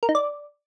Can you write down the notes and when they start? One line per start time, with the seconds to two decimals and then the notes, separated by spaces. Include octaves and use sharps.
0.03 A#4
0.09 D#4
0.15 D5